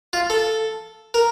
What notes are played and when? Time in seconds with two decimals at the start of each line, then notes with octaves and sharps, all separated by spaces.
0.13 F4
0.30 A4
1.14 A#4